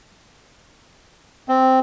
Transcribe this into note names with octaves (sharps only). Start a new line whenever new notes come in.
C4